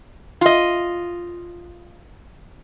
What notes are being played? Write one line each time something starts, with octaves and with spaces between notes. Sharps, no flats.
F4 D#5